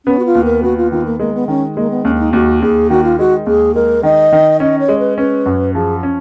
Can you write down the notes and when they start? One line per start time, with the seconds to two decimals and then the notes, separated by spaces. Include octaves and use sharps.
0.06 B3 C#4
0.19 F#4
0.26 F4
0.35 D#2
0.45 A#4
0.63 B3 F#4
0.77 F4
0.92 D#3 F4
1.06 A#3
1.19 G#3 A#3
1.35 B3
1.48 D#3 C#4
1.76 G#3 A#3
1.90 B3
2.05 D#2 C#4
2.15 C#4
2.19 D#4
2.33 D#2 F#4
2.62 D#2 G#4
2.90 D#3 F#4
3.04 F4
3.19 G#3 F#4
3.46 D#2 G#4
3.75 G#3 A#4
4.03 D#3 D#5
4.33 D#3
4.60 C#4 D#5
4.79 C#5
4.88 G#3
4.99 B4
5.18 C#4 B4
5.46 F#2
5.74 F3 G#4
6.03 C#4